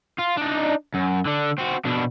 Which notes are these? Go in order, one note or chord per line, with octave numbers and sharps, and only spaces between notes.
F4
D4 D#4
F#2
D3 D4
C4 F#4
B2 D4